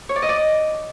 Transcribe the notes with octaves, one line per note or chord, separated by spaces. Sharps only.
C#5
D5
D#5
D5